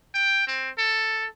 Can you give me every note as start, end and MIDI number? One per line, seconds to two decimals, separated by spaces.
0.14 0.46 79
0.47 0.70 60
0.78 1.27 69